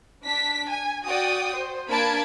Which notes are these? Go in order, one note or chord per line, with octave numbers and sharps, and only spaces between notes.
D4 B6
G#5
F#4 D5 G5 D#6
C5
A#3 D4 A5 B5 G#6 D7